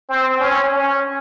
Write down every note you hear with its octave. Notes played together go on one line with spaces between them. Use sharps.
C4
C#4
C#4